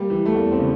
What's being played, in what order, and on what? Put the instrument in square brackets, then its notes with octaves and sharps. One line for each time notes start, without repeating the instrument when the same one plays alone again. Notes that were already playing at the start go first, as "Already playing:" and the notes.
Already playing: [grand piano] G3 A#3
E3
A3
E2 A#3
C4
C#3